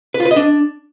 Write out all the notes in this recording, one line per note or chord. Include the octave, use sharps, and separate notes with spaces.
B4
F4
B4
D#5
D4